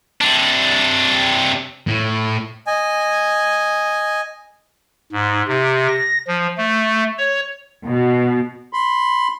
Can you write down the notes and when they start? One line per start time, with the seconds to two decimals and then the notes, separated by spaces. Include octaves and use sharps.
0.21 C3 D4
1.87 A2
2.67 D#5 G#5
5.12 G#2
5.48 C3
5.88 A#6
6.27 F3
6.58 A3
7.18 C#5
7.85 B2
8.73 B5 C6